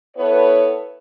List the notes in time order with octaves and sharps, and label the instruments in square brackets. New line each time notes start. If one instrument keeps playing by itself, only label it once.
[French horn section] B3 E4 A4 B4 C#5